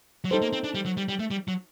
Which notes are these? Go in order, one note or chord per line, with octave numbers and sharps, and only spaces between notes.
F#3
G3 D#4 A4 C5
A#3
C4
D4
G3
F#3
G3
G3
A3
G3
F#3